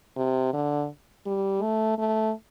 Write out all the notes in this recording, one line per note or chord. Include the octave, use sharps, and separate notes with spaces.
C3
D3
G3
A3
A3